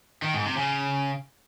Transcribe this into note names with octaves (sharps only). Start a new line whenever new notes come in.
D#3
G#2
C3
C#3